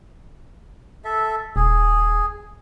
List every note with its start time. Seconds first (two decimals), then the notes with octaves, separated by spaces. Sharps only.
1.04 A4 E5
1.56 D#1 G#4